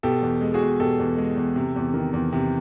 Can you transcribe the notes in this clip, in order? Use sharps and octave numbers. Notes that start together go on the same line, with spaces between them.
B2 G4 A4
E2
G#3
F#4 G#4
E2
B2 G4 A4
E2
G#3
E2
C3
E2
D#3
E2
C3